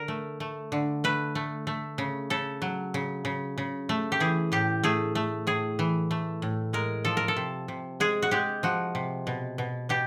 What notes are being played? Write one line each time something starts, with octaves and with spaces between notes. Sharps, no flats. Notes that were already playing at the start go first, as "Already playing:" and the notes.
Already playing: D3 A#4
A3
A3
D3
A3 B4
A3
A3
C#3
C#3 A4
F#3
C#3
C#3
C#3
A3
G4
E3 G#4
A2 G4
A3 G#4
A3
A2 G#4
E3
A3
A2
G#3 A#4
F3 A4
A#4
A4
C3
C3
G#3 G#4
F#4
G#3 G4
F3 F#4
C3
B2
B2
B2 G4